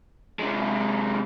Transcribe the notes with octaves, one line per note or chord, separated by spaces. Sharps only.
C3 G#3